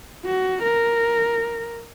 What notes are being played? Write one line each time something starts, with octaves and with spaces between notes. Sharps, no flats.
F#4
A#4